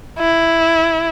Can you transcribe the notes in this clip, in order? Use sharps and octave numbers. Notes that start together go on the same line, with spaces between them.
E4